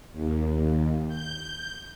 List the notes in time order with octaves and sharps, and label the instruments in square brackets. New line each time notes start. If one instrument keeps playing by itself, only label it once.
[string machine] D#2
G6